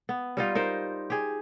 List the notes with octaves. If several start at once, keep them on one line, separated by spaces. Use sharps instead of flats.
B3
G3 D#4 F4
D#4 A#4 C5
G4 G#4